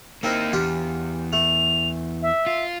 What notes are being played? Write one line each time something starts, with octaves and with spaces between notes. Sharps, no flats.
A#3 C4 D#4 E4 A#4
E2 D4 F4 G4
A3 F7
E5
F4